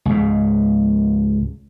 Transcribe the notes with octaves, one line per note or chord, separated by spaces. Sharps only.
C#2 G#2